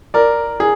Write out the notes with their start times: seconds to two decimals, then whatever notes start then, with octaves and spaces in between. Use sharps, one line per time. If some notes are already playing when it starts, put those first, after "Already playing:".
0.14 A#4 D5
0.60 G#4